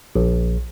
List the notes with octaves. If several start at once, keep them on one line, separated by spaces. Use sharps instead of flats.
A#1